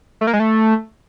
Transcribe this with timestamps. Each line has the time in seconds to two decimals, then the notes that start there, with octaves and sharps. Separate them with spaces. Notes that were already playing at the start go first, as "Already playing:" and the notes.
0.21 A3
0.27 A#3
0.33 G#3
0.40 A3